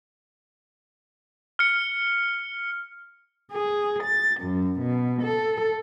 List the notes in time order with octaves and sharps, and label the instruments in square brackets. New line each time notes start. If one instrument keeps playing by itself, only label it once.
[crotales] F6 C#7
[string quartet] G#4
A6
F#2
B2
A4